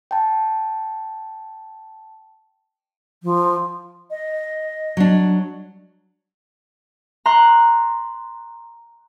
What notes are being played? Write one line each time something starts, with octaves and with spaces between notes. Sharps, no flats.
G5 A5
F3
D#5
F#3 D4
A#5 C6 F#6